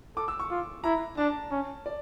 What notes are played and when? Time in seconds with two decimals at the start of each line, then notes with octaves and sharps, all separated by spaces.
0.17 A4 D6
0.28 E6
0.40 C#6
0.50 F4
0.84 E4 A#5
1.17 D4 A5
1.51 C#4
1.86 D5